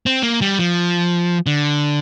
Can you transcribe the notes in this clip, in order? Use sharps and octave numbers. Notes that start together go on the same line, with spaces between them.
C4
A#3
G3
F3
D3